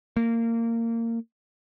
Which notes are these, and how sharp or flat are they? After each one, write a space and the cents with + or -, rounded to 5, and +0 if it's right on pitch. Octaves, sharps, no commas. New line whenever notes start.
A#3 -20